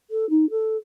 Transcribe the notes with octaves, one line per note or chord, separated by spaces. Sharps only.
A4
D#4
A4